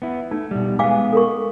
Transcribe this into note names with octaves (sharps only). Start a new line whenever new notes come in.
B3 E4
A3 D#4
B2 G3
G#3 B3 F5 G#5 D6
A4 A#4 C#6